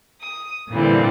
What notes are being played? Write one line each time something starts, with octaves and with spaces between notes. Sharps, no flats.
D#6
A#2 D3 E3 G3 C4